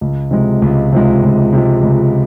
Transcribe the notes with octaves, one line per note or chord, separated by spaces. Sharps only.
C#2
C3 F3 G#3
C#2
C3 F3 G#3
C#2
C3 F3 G#3
C#2